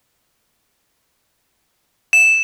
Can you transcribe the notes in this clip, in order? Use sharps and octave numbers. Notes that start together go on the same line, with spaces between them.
E7